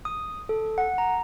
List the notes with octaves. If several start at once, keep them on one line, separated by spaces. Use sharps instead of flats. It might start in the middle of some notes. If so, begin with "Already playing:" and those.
D#6
A4
F#5
A#5